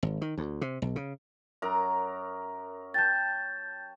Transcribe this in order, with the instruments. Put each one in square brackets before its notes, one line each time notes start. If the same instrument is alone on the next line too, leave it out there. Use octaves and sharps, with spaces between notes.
[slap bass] G#1
D#3
D2
C3
B1
C#3
[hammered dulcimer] F#2 A#4 A#5
[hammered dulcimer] G5 A5 [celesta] G6 A6